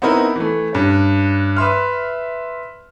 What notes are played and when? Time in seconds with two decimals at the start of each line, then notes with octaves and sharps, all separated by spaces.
0.02 B3 C4 D#4 E4 A#4
0.36 E3 A3
0.73 G2 C#4
1.57 B4 E5 C6 F6